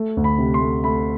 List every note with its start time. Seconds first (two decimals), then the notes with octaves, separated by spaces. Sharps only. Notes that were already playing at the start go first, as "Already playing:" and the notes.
Already playing: A3
0.17 D2
0.24 B5
0.38 C3
0.54 C6
0.61 A3
0.84 A3 B5